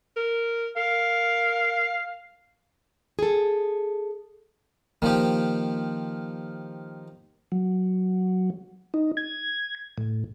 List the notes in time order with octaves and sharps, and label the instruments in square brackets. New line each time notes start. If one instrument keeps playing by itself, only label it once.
[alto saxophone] A#4
[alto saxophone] A#4 [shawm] F5
[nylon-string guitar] G#4 A4
[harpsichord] D#3 F3 G4 [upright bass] A#3
[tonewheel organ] F#3
D#4
G#6
A2